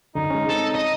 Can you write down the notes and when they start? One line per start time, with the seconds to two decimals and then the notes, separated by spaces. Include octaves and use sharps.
0.15 F#2 D3 D#4
0.30 G#3 C#4
0.49 C4 A4 C#5
0.74 D#5